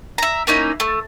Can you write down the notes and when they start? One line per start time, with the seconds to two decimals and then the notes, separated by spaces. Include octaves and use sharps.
0.18 E5 A#5
0.47 A#3 C#4 D#4 E4
0.80 A3